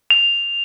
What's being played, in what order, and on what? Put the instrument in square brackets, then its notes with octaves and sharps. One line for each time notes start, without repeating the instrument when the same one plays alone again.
[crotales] F7